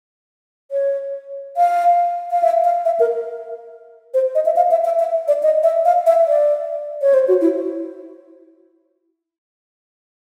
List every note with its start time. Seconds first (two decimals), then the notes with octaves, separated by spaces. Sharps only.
0.71 C#5
1.57 F5
2.31 F5
2.43 E5
2.64 F5
2.85 E5
3.00 A#4
4.14 C5
4.35 D#5
4.45 E5
4.56 F5
4.71 E5
4.85 E5
4.99 E5
5.28 D5
5.43 D#5
5.63 E5
5.85 F5
6.06 E5
6.28 D5
7.02 C#5
7.14 C5
7.28 F#4
7.41 E4